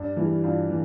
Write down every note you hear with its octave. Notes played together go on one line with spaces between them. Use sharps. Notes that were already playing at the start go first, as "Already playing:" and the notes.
Already playing: G2 D4
E3 G3 E4
G2 F4
E3